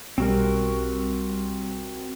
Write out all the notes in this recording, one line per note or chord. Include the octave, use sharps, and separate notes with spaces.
B1 G3 C4 F#4 A#4